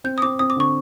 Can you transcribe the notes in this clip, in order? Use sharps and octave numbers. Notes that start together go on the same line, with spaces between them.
C4 G6
D#6
C4 D6
C4 D#6
D6
D3 C#6